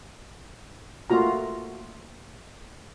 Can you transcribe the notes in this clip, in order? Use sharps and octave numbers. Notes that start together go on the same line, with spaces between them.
A3 A#3 F4 F#4 A#5